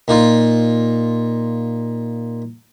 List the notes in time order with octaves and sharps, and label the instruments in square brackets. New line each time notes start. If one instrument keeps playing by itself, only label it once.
[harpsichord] A#2 D#4 F4